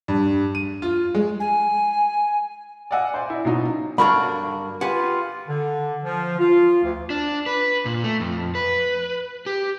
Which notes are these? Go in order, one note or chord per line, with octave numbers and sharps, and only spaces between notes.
G2
D#7
F4
G#3
G#5
D5 D#5 F5 F#5 G#5 E6
C5 D5 G#5
E4 D#5
B2 F#3 D#4 F4
G2 D3 F#3 A#3 D4 F#4 A#4 B5
F4 G4 B4 F#5 G#5
D3
F3
F4
D2
D4
B4
A#2
A3
F2
B4
G4